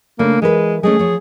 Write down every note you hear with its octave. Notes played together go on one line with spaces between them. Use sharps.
C#3 A3 A#3 D4
E3 G#3 A#4 B4
G#3 A3 C#4 G#4
F3 C#5